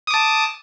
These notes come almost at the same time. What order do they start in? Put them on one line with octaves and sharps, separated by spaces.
D#6 D6 A5